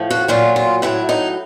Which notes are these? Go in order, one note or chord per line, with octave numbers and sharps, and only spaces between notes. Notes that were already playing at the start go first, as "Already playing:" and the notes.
Already playing: A2 F3
F#4
A#2 F#3 F4
F4
A2 F#3 E4
D#4